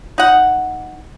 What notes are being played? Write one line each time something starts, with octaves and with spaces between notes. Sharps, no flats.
D#4 F#5